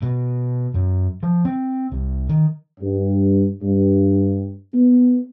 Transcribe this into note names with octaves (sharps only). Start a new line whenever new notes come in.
B2
F#2
F3
C4
C2
D#3
G2
G2
B3